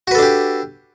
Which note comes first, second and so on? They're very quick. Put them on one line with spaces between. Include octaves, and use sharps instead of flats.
F#4 B4 A4 D4 G4